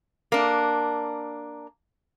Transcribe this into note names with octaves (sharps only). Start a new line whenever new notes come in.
A#3 D4